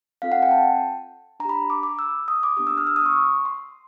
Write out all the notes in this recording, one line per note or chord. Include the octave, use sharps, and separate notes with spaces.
C4 F4 A4 F5
F#5
G5
A5
D4 A#5
G4 B5
D6
D6
E6
D#6
D6
B3 D4 G4 D#6
E6
F6
E6
D#6
C#6
C6